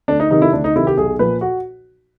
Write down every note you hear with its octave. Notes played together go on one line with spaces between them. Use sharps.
D2 D4
D#4
C3 D#3 D#4
E4
D2 D4
D#4
C3 D#3 E4
G4
B1 G#4
A#2 F3 B4
F#4